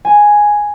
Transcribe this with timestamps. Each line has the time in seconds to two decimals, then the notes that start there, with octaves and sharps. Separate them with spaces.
0.05 G#5